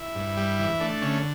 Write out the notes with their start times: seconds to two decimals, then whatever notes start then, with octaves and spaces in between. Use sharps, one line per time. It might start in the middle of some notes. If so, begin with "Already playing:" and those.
Already playing: E4
0.15 G2
0.37 G3
0.59 E3
0.80 A3 D4
1.02 D3 C#4